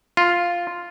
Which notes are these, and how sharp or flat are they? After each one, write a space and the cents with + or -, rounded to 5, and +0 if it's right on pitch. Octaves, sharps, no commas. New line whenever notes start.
F4 +0